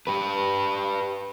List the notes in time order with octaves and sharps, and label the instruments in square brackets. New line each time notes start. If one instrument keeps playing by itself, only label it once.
[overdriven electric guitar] G4 B4